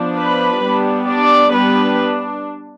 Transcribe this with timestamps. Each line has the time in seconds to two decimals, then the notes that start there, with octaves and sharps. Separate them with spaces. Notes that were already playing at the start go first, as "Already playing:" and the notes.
Already playing: F3 B3 D4
0.19 B4 B5
0.63 G3 B3 D4
1.08 D4 D5
1.52 G3 B3 D4 B4